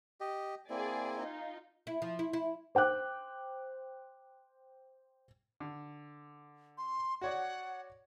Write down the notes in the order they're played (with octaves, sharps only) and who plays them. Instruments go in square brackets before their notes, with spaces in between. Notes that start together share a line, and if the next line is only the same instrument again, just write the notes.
[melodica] G4 D#5
[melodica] A#3 C4 E4 [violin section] G#4 D5 G#5
[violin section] D#4 F4
[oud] E4
F3
E4
E4
[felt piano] C5 G5 D6 F#6
[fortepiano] D3
[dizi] C6
[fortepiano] F#4 C#5 D5 [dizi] F#5